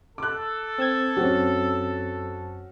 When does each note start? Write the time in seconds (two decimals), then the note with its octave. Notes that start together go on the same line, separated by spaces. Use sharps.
0.18 A4 D6 F#6
0.78 C4 E6 G#6
1.17 F#2 C4 C#4 F#4